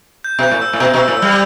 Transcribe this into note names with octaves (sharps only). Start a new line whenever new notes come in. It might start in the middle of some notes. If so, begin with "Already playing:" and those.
G6
B2
G6
A2
E6
A2
B2 G6
B2
E6
A2
E6
G3